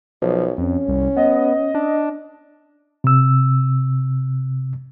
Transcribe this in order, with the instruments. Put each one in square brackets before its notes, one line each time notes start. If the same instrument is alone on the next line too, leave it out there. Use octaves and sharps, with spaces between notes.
[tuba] B1 [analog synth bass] F3
[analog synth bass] F2 [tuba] C#4
[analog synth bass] C2
[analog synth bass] B3 [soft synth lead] D#5
[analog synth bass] D4
[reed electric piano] C3 E6